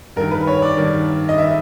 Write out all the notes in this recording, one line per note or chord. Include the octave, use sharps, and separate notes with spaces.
G2 D#3 A#4
B4
C#5
D5
G2 D#3
D#5
D#3 E5